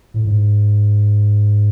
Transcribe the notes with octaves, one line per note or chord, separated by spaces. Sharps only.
A2
G#2